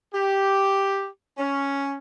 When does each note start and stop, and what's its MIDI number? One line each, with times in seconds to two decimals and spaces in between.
0.13 1.06 67
1.38 1.96 61